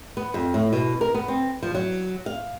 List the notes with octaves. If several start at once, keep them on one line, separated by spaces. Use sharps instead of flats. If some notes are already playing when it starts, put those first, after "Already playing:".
B3
F2
A2
B2
A#4
B3
C4
F3
F#3
F5